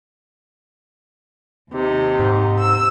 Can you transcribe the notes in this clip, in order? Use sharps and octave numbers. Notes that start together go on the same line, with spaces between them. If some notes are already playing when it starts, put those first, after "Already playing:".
D#2 C3 D#4
G#2
E6